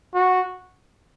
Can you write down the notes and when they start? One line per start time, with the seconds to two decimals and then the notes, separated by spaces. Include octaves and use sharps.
0.14 F#4